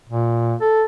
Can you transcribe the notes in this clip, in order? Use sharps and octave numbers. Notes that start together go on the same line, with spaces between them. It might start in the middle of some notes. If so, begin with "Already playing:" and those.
A#2
A4